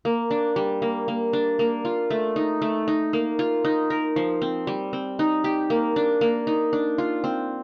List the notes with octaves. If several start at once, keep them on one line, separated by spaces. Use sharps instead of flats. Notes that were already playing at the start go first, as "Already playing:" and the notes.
A#3
D4
G3
A#3
A#3
D4
A#3
F4
A3
D#4
A3
D#4
A#3
F4
D#4
A#4
F3
C4
G3
C4
D#4
G4
A#3
D4
A#3
D#4
D4
F4
C4